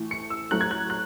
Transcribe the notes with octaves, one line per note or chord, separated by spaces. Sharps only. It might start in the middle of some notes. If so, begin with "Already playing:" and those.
Already playing: A2 E3 A3
C#7
E6
A2 F#3 A3 F#6
G#6
F#6
F#6